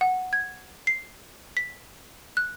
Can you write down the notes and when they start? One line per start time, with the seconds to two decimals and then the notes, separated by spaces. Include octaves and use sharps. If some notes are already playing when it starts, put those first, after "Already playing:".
0.01 F#5
0.33 G#6
0.87 C7
1.57 B6
2.37 F#6